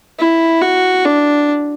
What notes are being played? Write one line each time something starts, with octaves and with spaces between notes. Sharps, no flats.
E4
F#4
D4